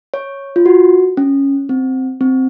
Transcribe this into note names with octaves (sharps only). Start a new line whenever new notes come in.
C#5
F4
F#4
C#4
C4
C4